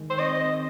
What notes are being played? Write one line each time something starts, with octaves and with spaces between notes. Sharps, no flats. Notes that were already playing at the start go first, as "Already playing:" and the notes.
Already playing: D#3 G#3
C5
C4 D#5